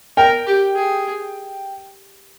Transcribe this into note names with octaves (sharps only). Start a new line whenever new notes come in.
A#4 G5
G4
G#4